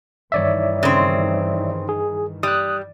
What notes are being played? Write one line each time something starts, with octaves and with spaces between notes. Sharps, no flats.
G2 D#3 E3 C#5 D5 E5
C#3 C4
G#4
G3 D#6 F#6